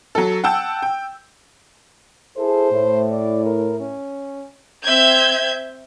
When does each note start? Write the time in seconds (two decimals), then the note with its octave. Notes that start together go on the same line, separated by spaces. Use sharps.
0.15 F#3 A4
0.44 F#5 G5 A5 E6 G6
0.82 G5
2.37 E4 G#4 A4 C5
2.71 A2
3.10 D5
3.45 A#4
3.80 C#4
4.84 C4 E5 G6 G#6